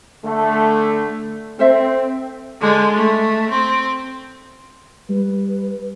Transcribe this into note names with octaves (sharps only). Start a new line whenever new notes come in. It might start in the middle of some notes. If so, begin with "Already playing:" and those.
D3 A3
C4 A4 C5 E5
D3 G#3
A3
C4
G3 B4